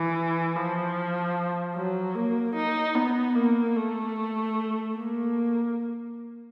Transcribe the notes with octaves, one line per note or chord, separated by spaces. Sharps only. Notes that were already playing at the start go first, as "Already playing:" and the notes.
Already playing: E3
F3
F#3
A#3
D#4
B3
A#3
A3
A#3